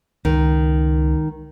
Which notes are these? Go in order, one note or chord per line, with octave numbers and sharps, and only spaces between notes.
C#2 D#3